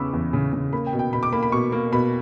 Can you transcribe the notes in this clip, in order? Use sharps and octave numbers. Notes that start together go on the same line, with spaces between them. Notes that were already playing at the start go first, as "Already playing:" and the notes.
Already playing: E2 C#3 B3 B5 C#6 D6 E6
E2
C#3
C#3
A#3 B5
G5
B2
G5
B2 B5
D6
A#3 B5
B5
B2 C#6
A#3
B2 B5